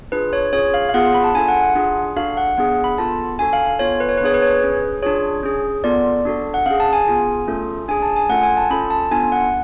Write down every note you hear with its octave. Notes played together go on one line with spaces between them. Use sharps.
D4 F4 G#4 B4
C#5
C#4 F4 G#4 C#5
F5
F5
B3 F4 G#4 F#5
B5
A5
D4 F4 A4 G#5
F#5
F#5
D4 F4 G#4
D4 F#4 A4 F5
F#5
B3 D4 G#4 F#5
B5
B3 F4 A4 A5
D4 F#4 A4 G#5
F5
F5
B3 F4 A4 C#5
B4
C#5
B4
B3 D4 G#4 C#5
B4
C#5
B4
C#4 G#4
D4 F4 G#4 C#5
C#4 G#4
B3 F4 A4 D5
D4 F#4 A4
F#5
C#4 G#4 F5
A5
G#5
B3 F4 G#4
A3 C#4 F4 A4
D4 G#4 G#5
A5
G#5
A3 C#4 F4 A4 F#5
G#5
A5
C#4 F4 A4 B5
A5
B3 D4 F4 A4 G#5
F#5